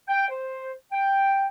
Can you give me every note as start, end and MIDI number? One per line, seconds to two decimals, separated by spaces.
0.07 0.28 79
0.29 0.71 72
0.91 1.45 79